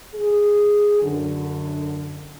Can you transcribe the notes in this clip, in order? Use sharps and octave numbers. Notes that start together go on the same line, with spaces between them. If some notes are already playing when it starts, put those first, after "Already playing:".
G#4
F#2 D3